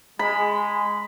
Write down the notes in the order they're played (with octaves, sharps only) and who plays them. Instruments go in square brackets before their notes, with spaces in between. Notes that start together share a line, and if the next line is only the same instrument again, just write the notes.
[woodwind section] G#3 [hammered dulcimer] B5